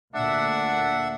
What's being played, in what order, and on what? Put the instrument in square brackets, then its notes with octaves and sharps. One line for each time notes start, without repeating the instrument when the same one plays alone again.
[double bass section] D2 A#2 [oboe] D4 [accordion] E5 F#5